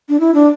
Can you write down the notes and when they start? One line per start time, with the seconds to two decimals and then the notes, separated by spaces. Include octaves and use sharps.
0.09 D4
0.20 E4
0.34 D4